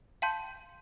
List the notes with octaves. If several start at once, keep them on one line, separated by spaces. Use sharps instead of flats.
F5 G5 A5 C6 G6